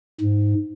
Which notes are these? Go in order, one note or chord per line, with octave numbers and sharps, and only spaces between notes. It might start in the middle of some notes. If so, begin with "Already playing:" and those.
G#2